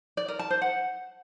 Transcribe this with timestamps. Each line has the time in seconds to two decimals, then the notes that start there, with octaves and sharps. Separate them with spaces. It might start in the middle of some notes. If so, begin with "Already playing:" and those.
0.17 D5
0.28 A#4
0.39 A5
0.50 C5
0.62 F#5